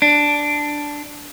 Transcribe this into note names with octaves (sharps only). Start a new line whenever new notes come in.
D4